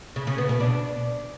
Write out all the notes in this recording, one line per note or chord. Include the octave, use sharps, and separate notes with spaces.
C#3
C#3
B3
B2
D4